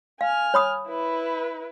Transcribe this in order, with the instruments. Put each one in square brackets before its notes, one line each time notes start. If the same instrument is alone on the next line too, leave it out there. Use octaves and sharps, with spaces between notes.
[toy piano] F5 [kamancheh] G#5 F6
[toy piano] C#5 B5 D#6
[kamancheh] E4 B4